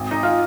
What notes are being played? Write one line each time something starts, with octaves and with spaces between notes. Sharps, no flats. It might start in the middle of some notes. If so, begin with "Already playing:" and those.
Already playing: G#1
D#4
F4